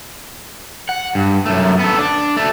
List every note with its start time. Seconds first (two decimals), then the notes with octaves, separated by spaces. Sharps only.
0.89 F#5
1.15 G2
1.46 F#2 A3
1.79 B3 A4
1.98 D4
2.37 A3 D4